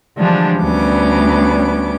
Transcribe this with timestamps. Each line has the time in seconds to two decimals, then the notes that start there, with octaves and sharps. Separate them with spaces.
0.17 D3 E3 F3 G3 G#3 D4
0.59 D2 G3 B3 C#4 D6